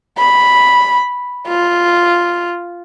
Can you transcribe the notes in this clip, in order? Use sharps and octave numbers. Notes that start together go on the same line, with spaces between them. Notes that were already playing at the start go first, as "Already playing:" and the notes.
B5
F4